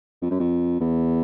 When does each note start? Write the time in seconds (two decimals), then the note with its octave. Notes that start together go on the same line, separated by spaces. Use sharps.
0.22 F2
0.31 F#2
0.40 F2
0.80 E2